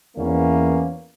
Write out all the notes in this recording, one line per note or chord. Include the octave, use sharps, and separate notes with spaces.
E2 A#3 B3 C#4